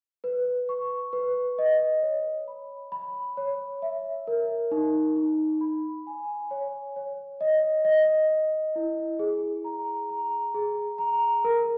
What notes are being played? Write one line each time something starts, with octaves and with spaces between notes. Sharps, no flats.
B4
C#6
B4
D#5
C#5
B5
B5
C#5
E5
A#4
D#4
D#4
B5
G#5
C#5
C#5
D#5
D#5
D#5
E4
G#4
A#5
A#5
G#4
A#5
A#4